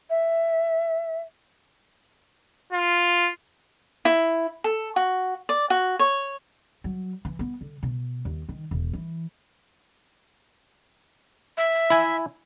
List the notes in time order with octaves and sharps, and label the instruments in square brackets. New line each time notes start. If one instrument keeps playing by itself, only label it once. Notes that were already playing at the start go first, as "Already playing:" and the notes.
[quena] E5
[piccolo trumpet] F4
[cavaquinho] E4
A4
F#4
D5
F#4
C#5
[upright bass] F#3
E3
B3
D3
B2
D#2
D#3
E1
E3
[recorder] E5
[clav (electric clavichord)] E4 G#5